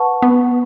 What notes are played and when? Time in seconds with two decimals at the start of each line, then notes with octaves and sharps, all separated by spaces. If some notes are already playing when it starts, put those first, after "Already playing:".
Already playing: B4 F#5 A5 C#6
0.22 B3